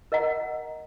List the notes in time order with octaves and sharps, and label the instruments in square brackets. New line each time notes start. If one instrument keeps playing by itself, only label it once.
[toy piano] A#4 D#5 F#5 A#5